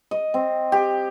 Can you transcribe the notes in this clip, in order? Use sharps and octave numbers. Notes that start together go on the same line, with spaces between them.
D#5
C4
G4